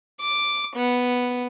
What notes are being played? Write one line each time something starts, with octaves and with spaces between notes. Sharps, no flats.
D6
B3